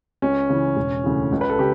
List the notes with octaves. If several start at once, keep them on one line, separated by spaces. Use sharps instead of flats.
C#2 C#4
C#3 E3
E1
D2 C#3 E3
C#2
B4
A4
C#3 G4